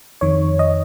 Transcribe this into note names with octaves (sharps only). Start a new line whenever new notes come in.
F2 D#3 C#5
D#5